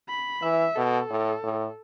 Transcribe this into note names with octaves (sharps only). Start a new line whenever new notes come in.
B5
E3 E5
B2 A4
A2
A2